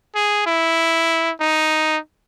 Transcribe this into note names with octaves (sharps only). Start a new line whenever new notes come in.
G#4
E4
D#4